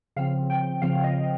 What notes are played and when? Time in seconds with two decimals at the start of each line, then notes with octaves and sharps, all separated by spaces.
0.16 C#3 F3 C4 F5
0.50 G5
0.82 C#3 F3 C4 F5
1.04 D#5